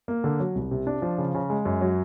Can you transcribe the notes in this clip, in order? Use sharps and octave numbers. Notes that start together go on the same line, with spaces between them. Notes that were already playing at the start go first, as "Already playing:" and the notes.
A#3
D3
F#3
C2
C3
D4
F3
C#3
C#3
G#3
F#2
F#3